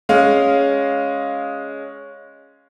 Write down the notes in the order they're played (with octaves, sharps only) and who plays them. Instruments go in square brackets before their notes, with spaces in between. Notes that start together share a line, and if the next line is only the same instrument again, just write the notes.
[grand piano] G#3 C#4 F5